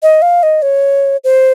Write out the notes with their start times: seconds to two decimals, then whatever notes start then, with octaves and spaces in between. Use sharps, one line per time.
0.03 D#5
0.22 F5
0.43 D#5
0.62 C#5
1.24 C5